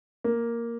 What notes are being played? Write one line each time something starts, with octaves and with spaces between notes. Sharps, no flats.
A#3